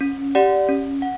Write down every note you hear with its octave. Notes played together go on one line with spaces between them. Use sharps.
C#4
G4 D5 F#5
C#4
F#5